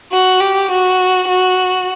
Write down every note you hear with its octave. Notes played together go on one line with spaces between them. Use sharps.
F#4
G4
F#4
F#4